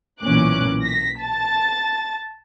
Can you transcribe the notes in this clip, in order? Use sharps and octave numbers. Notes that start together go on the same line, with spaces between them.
B1 A#2 E3 C#4 D6 F#6
A#6 B6
A5 A6